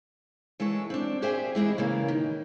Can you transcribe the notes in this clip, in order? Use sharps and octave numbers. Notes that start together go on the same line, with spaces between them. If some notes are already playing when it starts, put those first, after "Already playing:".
E3 G#3 A4 C#5
C4 D4
G4 G#4 C5 E5 G5 G#5
E3 G#3 D4 E4
C#3 E3 A#3
D#3